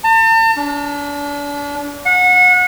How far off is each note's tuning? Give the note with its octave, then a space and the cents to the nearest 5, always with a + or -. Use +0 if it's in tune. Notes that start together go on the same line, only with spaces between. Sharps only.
A5 +40
D4 -35
F#5 -30